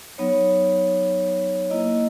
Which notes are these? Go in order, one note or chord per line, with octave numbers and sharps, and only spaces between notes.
F#3 B3 D#4 C#5
A#3 E4 D#5